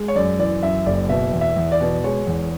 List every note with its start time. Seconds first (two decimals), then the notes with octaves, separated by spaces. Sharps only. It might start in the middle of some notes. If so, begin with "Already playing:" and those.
Already playing: G#3
0.08 C#5
0.15 F#2 D5
0.39 E3 D5
0.63 F#2 E5
0.86 F#1 D5
1.09 B2 E5
1.33 E2
1.41 E5
1.56 E2
1.72 D5
1.81 B2
2.04 G#3 C#5
2.27 E2